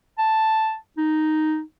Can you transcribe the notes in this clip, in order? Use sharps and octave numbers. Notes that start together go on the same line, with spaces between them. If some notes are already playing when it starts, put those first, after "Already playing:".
A5
D#4